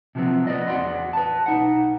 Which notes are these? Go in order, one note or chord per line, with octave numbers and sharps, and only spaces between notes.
C3 F3 F#3 G#3 B3 C4
B3 B4 D5 D#5
E2 F#4 D5 F#5 C6
B4 A5
B1 D#4 F#5